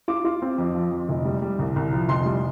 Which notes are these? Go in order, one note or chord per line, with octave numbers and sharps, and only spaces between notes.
F4 D6
F4
C4
F2
F3
F2
F1
G3
G3
C2
C2
F3
F1 C6
G3